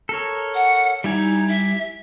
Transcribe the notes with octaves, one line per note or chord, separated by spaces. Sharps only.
A4 A#4 C#5
F#5
G3 D#4 E4 G#5
E5